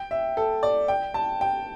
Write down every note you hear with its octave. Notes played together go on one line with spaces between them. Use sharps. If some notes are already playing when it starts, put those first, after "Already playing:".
Already playing: G5
E5
A4
D5
G5
A5
G5